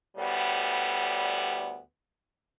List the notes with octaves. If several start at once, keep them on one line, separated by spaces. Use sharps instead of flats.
D2 A2 G3 B3